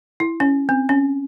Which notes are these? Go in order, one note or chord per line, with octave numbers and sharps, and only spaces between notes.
E4
C#4
C4
C#4